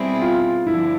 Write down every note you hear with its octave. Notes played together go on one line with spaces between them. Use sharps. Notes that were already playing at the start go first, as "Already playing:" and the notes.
Already playing: B2 G3 C4 E4 G#4
F4
G2 D3 F3 E4